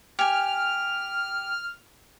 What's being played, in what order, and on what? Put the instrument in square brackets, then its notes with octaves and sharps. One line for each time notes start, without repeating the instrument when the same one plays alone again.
[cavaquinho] G4 G#5 [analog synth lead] F6